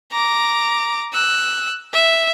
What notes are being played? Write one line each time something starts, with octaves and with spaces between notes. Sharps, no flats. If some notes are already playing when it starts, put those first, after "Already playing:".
A#5 D6
E6 F#6
E5